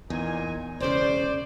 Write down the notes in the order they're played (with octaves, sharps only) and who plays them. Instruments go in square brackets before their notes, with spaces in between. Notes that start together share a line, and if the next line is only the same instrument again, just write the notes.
[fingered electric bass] E2 [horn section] A#2 D#4 G#5
[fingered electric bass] E1 C#3 [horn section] C5 [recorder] D5